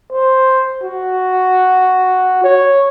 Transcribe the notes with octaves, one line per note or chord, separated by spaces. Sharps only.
C5
F#4
C#5